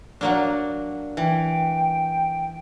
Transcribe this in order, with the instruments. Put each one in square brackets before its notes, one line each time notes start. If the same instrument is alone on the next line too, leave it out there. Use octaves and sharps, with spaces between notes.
[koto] F#3 A#3 D4
[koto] E3 [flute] G5